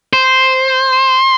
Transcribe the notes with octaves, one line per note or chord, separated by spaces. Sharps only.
C5